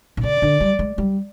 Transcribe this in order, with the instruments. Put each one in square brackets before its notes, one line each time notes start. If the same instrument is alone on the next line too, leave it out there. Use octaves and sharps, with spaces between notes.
[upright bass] C3
[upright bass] C#3 [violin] D5
[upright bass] D3
G3
G#3
G3